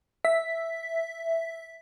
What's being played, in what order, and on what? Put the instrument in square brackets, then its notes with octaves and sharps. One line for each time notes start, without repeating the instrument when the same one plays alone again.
[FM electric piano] E5 B6